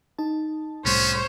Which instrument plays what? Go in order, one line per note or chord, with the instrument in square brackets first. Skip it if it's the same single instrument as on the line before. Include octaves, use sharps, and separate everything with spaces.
[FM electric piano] D#4 A5
[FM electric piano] C2 A2 G3 [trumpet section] B3 C#4 [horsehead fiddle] C5 C#5